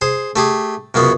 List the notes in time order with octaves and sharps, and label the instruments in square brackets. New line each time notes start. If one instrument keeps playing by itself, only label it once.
[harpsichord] G#4 C5
A3 G4 G#4
C#2 F#2 C#3 B3